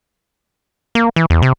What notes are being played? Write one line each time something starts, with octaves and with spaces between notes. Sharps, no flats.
A#3
E3
E2
C3